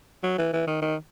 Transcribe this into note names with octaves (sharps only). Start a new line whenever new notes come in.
F#3
E3
E3
D#3
D#3